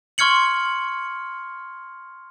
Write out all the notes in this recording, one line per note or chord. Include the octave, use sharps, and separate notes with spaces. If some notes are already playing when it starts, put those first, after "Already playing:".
C6 C#6 F6 G#6 C#7 F#7